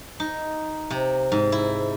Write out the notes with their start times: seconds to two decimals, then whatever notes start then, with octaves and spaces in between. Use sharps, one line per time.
0.20 D#4
0.90 C3
1.32 G#2
1.52 E4